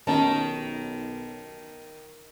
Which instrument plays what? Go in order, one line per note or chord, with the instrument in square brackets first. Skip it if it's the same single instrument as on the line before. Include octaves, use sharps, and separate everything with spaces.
[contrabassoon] B1 [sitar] D#3 [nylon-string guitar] C#4 D#4 G4 [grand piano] A5